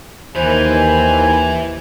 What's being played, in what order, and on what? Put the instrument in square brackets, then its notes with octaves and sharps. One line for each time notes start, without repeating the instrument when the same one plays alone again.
[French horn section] D#2 [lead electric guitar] E3 B4 [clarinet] C5 [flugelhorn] G#5